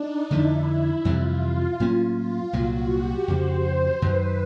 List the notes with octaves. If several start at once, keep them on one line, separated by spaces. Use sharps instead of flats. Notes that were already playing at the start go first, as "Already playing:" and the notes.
Already playing: D4 D#4
F2 D3 F3 A3 E4
F2 C3 E3 G3 F4
A2 F#3 A#3 C#4
F4
C2 A#2 F#3 F#4
G4
F2 C#3 F3 A3 C5
F#2 D#3 F#3 B4